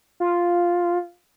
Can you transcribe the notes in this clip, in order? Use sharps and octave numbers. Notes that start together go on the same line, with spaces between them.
F4